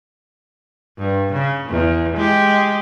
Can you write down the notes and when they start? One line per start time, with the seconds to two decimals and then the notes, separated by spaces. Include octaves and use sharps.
0.98 G2
1.33 C#3
1.69 E2
2.17 G#3 G4